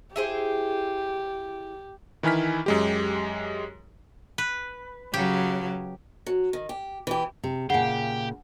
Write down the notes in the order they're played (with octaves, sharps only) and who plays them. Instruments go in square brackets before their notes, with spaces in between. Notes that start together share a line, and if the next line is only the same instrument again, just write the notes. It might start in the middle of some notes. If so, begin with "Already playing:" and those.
[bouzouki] E4 G#4 C5 [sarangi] G4
[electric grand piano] D#3 E3 E4 G#5 F6 B6
F#2 G#3 G4
[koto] B4
[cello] C#3 F#3 [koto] G4
[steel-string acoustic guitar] F#3
D#3
G4
E3 G4
[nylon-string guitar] C3
[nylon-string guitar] A#2 C#3 [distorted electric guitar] G4 [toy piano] F#5 G#5